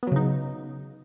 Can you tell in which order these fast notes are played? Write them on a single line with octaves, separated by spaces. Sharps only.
B3 F#3 C#3 D#4